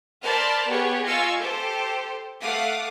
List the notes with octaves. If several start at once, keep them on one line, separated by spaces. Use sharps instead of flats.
A#4 C5 D5 A5 B5 F6
B3 G4 G#4 C#5
F4 D#5 F5 G#5 C#6 E6
G4 A4 C5
A3 F5 F#5 D6 D#6